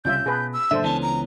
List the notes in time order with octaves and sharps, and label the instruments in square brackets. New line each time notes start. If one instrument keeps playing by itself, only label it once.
[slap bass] C2 C#3 G3 [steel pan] C#4 F4 E5 [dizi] G6
[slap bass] B2 [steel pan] G#4 B4 A5
[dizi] E6
[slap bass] F#1 A2 D3 [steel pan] D4 A4 C5 [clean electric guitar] E5
[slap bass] C#2 [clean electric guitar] E3 B3 C#4 [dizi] A5
[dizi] A#5